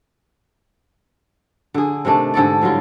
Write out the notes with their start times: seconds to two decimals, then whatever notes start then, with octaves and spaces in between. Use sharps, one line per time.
1.74 D3 G#4
2.05 C3 D#3 A3 D4
2.34 G#2 D3 A4 D5
2.61 A2 F#3 G3 F4